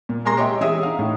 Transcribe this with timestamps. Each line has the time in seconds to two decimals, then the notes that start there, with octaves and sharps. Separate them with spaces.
0.09 A#2
0.25 G#3 A#4 G#5 A#5 C6 A#6
0.37 G4 C#5 D#5 E5 G5
0.61 E3 C#4 G4 G#4 E5 D#6
0.83 D#4 F5
0.99 A2